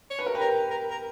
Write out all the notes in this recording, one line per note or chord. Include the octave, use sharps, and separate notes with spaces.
C#5
B4
A#4
G4 B4
A#4
A#4
A#4